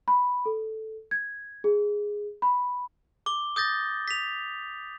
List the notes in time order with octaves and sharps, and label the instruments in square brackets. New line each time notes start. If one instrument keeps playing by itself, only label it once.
[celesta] B5
A4
G#6
G#4
B5
[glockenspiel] D6 G7
D#6 G6 A6 A#6
B6 F7